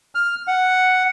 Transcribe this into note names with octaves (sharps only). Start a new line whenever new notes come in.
F6
F#5